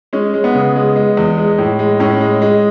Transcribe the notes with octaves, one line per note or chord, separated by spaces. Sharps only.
G#3 C#4
G#3
B3
C#3
G#3
G#3
E2
G#3
A2
G#3
A2 C#4
G#3
G#3